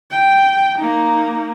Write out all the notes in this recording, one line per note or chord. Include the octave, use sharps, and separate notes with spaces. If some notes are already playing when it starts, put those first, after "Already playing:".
G5
A#3 D#4